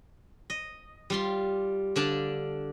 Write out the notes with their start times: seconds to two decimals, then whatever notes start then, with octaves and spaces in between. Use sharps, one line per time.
0.50 D#5
1.10 G3 F4 C6
1.96 D3 D4 F5 A5